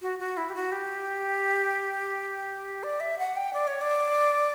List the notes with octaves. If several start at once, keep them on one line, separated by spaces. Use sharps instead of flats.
F#4
F#4
E4
G4
F#4
G4
D5
E5
F#5
G5
D5
C#5
D5